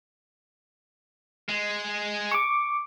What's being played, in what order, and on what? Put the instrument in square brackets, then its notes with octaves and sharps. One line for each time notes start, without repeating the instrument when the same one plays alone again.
[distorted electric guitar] G#3
[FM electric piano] C#6 D6